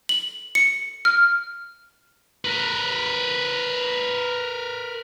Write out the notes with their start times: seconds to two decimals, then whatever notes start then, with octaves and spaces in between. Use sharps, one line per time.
0.09 F#7
0.55 C#7
1.05 F6
2.45 A#4 B4